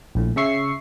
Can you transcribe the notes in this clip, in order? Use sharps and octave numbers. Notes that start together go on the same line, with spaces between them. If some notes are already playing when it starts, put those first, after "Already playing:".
A#1 A2
C#3 C#4 E5 C#6 C7